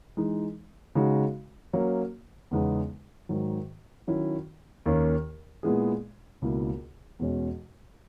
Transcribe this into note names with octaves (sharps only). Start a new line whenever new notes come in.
E3 G#3 D#4
C#3 G#3 D#4 F#4
F#3 A#3 C#4
E2 C#3 G#3 B3 D#4
G#2 D#3 F#3
D#3 F#3 C#4 E4
D#2 D#3 A#3 C#4
A#2 G#3 B3 E4 G#4
C#2 B2 A#3 E4 A#4
E2 B2 G#3 C#4